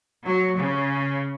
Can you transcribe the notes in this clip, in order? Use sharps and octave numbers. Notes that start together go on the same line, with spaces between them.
F#3
C#3